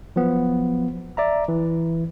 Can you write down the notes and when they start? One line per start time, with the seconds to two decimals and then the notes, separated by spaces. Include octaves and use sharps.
0.16 F3 F#3 B3
1.17 D5 E5 A#5
1.48 E3